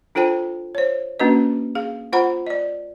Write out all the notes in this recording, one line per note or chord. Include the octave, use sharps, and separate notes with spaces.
D4 F4 A4 C5 G5 A5
C5 C#5
A#3 C#4 D4 F#4 B4 D#5
G#4 F5
F4 C5 F#5 A#5 B5
D5 D#5